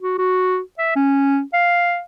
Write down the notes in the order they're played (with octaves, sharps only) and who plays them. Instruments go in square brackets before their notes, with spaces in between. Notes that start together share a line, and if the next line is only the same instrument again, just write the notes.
[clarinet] F#4
F#4
E5
C#4
F5